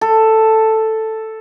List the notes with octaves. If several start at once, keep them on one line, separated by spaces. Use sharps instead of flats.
A4